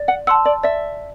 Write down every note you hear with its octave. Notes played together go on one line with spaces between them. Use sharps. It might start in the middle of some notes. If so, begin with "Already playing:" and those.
Already playing: D5
F#5
F#5 A5 C6 E6
D5
D5 E5